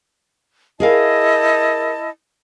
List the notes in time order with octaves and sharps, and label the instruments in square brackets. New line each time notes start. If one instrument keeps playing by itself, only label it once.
[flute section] E4 D#5 A5 [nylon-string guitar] G#4 A#4 F5